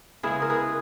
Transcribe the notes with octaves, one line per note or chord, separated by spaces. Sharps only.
C#3 G#3 B3 E4 G#4
A#4
G#4 B4